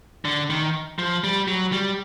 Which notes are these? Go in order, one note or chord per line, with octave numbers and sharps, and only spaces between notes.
D3
D#3
F3
G3
F#3
G3